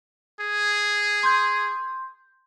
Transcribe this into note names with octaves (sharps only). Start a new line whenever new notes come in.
G#4
C6 G6